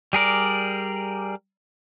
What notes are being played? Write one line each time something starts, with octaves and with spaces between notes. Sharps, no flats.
G3 G#4 A#4 D5